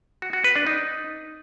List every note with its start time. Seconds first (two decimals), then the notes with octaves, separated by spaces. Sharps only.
0.22 F#4
0.33 F#4
0.44 B4
0.55 D4
0.67 D#4